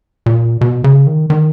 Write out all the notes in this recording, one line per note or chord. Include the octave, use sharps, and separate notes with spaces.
A#2
B2
C#3
D#3
D#3